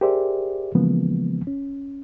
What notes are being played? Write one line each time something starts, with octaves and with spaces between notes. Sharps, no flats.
G4 G#4 A#4 C5 D5 E5
C#3 E3 F3 G#3 A#3 B3
C#4